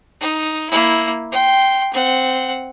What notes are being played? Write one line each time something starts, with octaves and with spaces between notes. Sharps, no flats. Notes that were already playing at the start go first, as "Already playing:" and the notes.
D#4
A#3 E4
G5 C6
C4 F#5